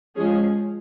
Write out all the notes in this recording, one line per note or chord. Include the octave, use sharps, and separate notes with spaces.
F3 G#3 C#4 G#4